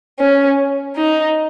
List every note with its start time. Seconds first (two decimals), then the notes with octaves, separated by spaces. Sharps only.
0.19 C#4
0.96 D#4